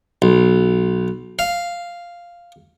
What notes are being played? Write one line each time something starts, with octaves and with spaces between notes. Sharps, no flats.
B1
F5